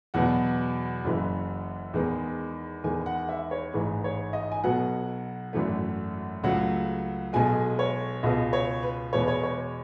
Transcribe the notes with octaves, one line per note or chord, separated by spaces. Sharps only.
E2 B2 F#3 B3 F#5
F#1 F#2 E3
E2 D#3 G#3 B3
E2 D#3 G#3 B3 G#5
F#5
E5
C#5
A1 G#2 E3 G#3 B4
C#5
D#5
G#5
B1 B2 F#3 B3 F#5
G#1 F#2 E3 A3
C#2 C#3 F#3 A3 F#5
B1 B2 G#3 G#5
C#5
C#2 B2 G#3 B3 D#5
C#5
B4
E2 B2 G#3 B3 C#5
B4
C#5
C#5